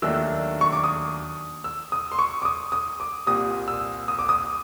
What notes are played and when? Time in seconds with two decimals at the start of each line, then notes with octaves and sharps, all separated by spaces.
0.02 D#2 D#3 F#3 A3 D4 E6
0.61 C#6
0.72 D6
0.84 D#6
1.64 E6
1.92 D#6
2.12 C6
2.19 C#6
2.42 D6
2.45 D#6
2.72 D#6
3.00 D6
3.27 C2 A#2 G3 D#6
3.68 E6
4.08 D#6
4.19 D6
4.29 D#6